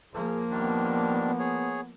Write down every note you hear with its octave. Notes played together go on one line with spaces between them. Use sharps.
F3 A#3 G#4
D#3 G3 B3 D4
G#4 C#5